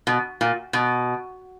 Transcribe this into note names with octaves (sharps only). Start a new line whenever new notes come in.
B2
A#2
B2